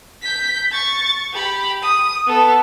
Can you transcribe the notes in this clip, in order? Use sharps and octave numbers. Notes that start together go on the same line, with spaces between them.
G6 B6
C#6 A6
G4 B5
D#6
B3 A4